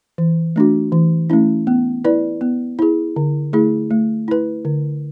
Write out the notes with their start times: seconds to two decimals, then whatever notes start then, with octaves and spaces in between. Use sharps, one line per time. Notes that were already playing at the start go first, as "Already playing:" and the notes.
0.18 E3
0.56 A3 D4 F#4
0.92 E3
1.30 A3 C#4 E4
1.67 B3
2.05 E4 B4 D5
2.41 B3
2.79 E4 G#4
3.16 D3
3.53 A3 E4 G#4
3.91 A3
4.28 E4 B4
4.65 D3